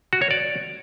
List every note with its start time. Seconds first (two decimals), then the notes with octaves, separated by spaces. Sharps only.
0.13 F#4
0.22 C#5
0.31 D5